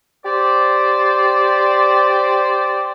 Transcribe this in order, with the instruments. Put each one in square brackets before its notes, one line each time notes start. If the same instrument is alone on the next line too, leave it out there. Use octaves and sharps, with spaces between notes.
[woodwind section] G4 C5 D5